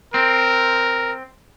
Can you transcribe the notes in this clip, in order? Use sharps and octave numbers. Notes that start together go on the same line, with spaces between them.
C4 A#4